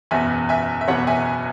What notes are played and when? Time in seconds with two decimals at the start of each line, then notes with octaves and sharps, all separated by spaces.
0.11 F#1 E2 B2 F#3 B3 E5 G#5
0.49 E5 G#5
0.81 E5
0.88 F#1 E2 B2 F#3 B3 C#5 F#5
1.07 E5 G#5